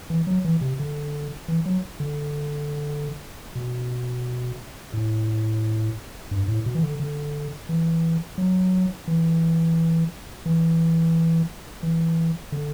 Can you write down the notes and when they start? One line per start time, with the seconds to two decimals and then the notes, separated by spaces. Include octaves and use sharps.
0.10 E3
0.27 F#3
0.45 E3
0.61 C3
0.80 D3
1.48 E3
1.66 F#3
2.00 D3
3.55 B2
4.93 A2
6.31 G2
6.48 A2
6.66 B2
6.75 E3
6.83 D3
7.00 D3
7.69 E3
8.38 F#3
9.08 E3
10.46 E3
11.83 E3
12.52 D3